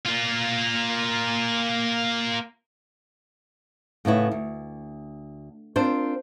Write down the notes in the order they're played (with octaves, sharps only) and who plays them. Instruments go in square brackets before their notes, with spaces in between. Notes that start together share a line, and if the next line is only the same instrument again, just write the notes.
[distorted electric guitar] A#3 F4
[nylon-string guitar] A2 C#3 B3 E4
D2
C4 D4 F4 A#4 C5